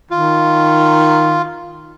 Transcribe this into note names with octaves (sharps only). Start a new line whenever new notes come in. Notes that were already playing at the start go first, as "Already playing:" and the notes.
D#3 F4